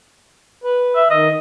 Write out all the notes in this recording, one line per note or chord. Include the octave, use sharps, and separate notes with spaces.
B4
E5
D#3 D#5